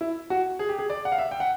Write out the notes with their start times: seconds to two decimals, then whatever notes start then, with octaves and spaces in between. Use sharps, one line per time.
0.01 E4
0.30 F#4
0.59 G#4
0.69 G4
0.79 G#4
0.90 D5
1.05 F#5
1.12 F5
1.18 E5
1.31 G5
1.40 F#5